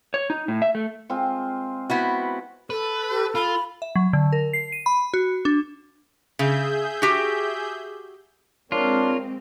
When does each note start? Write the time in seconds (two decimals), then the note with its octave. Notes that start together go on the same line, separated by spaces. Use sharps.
0.14 C#5
0.30 D#4
0.48 A2
0.62 E5
0.75 A3
1.09 G#3 C4 F4
1.90 B3 E4 F#4
2.70 A4 B4
3.10 G4
3.35 F4 B5
3.82 E5
3.96 F#3
4.13 D3
4.33 A#4
4.53 C7
4.72 D#7
4.86 B5
5.14 F#4
5.45 D4
6.39 C#3 G#4 E5 G6
7.02 F#4 G4
8.72 G#3 C4 D4 F4 A#4 C#5